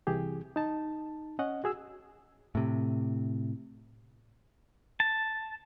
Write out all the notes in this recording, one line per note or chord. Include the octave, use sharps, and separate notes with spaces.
C2 E3 G4 G#4
D#4 A5
C#4 D#5 F#5
F#4 G#4 E6
A2 C3
A5